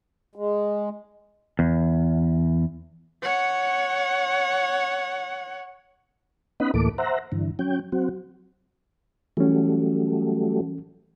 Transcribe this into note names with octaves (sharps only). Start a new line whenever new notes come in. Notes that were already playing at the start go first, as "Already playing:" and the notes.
G#3
E2
C#5 F#5
B3 C#4 D#4 D#5 F#5 B5
D2 A2 E3 A#3 A4 D6
C5 E5 F#5 A#5
G2 D3 E3
F#3 C#4 G5
F#3 C4 F#4
E3 F#3 G3 A3 C#4